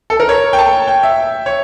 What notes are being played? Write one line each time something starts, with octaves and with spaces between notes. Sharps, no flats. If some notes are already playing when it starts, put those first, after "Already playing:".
A4
A#4
C#5
G5
A5
G5
E5
C#5